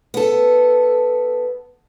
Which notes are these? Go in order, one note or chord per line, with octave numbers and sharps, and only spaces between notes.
B3 A4